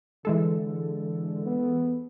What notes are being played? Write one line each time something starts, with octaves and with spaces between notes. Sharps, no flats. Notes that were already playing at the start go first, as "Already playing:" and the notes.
D3 E3 G#3 A4
B3